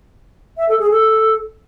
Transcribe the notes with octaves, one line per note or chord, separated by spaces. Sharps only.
E5
A4
G#4
A4